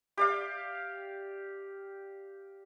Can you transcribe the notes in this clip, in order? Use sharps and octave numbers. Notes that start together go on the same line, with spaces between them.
G4 D5 F5